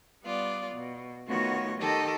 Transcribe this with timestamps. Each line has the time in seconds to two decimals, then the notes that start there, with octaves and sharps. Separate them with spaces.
0.22 G3 B3 F4 D5
0.73 B2
1.26 D#3 A3 B3 F4 F#4 C#5
1.78 D#3 G4 A4 D#5